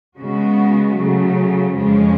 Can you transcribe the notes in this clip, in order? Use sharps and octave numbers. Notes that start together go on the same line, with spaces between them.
C#3 G#3 B3 F#4
C#3 F#3 A3
F2 C#3 F3 G#3 C#4